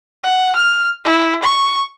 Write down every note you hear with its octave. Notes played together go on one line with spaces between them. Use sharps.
F#5
F6
E4
C#6